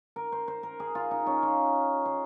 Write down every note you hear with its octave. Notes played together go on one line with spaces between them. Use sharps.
A#4
C5
C5
A#4
G#4
F4
D#4
C#4
F4
C5